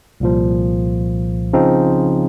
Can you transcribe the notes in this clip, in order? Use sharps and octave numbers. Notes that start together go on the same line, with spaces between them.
C2 A#2 F3
C#3 F3 C4 D#4